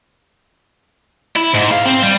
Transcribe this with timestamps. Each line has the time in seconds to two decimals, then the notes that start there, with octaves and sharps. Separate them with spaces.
1.36 E4
1.53 G#2
1.71 F5
1.86 C4
2.03 G3